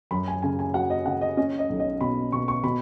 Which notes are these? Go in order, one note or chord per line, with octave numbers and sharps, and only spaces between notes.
F#2 B5
G#5
C#3 G#5
G#5
F#3 F#5
D#5
C#3 F#5
D#5
C#4 D#5
D#5
B1
D#5
B2 B5
B2 C#6
C#6
B2 B5